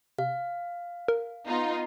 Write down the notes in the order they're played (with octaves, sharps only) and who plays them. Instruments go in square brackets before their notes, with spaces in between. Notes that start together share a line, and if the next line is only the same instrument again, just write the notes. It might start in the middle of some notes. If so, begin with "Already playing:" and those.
[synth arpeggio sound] C3 [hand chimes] F5
[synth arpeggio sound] A#4
[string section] B3 D#4 F4